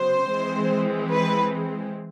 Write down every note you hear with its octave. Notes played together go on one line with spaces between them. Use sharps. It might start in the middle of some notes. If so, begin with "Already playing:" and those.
Already playing: C#3 F#3 B3 C5
E3 G#3 C4
B4